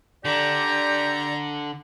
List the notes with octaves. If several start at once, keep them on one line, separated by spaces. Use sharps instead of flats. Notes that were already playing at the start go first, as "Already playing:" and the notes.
D3 G4 D5 A#5